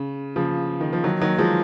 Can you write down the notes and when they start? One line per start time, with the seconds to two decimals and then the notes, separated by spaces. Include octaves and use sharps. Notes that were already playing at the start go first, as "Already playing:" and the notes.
Already playing: C#3
0.36 C#3 F3
0.81 D#3
0.93 F3
1.04 D#3 F#3
1.21 D#3 F#3
1.38 F3 G#3